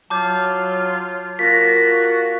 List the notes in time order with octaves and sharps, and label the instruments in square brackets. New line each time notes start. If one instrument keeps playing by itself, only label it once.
[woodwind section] F#3 F4 [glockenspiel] A5 D6 G6
[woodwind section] A#3 F4 F#4 [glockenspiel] A#6 B6